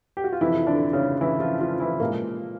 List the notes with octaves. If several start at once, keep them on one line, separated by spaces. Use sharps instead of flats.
G4
F#4
F4
F2 C3 E3 F3 E4
D3 D4
C#3 C#4
E3 E4
F3 F4
F3 F4
E3 E4
A#2 F3 G#3 A#3